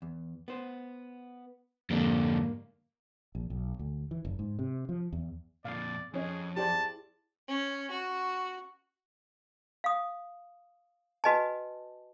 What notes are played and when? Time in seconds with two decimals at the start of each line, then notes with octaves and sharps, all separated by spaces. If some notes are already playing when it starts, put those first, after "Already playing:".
0.02 E2
0.48 B3 C5
1.90 F2 G#2 D3 G3 A#3
3.35 A#1
3.50 B1
3.79 D2
4.11 E3
4.25 F#1
4.39 G#2
4.59 C3
4.89 F3
5.13 E2
5.65 F2 A#2 D5 F5
6.14 F2 C#4 G#4 C#5 D#5
6.57 E4 G4 G#4 C5 D5 A5
7.48 C#4
7.91 F#4
9.84 F5 D#6
11.24 F#4 B4 D#5 G#5 A5